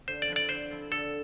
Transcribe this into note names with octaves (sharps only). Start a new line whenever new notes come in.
D3 C5
D5
F3 C4 E4
D5
D3 C5
F3 C4 E4
D3 A4